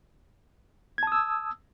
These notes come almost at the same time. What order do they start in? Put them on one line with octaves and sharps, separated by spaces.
G#6 A5 D#6 E6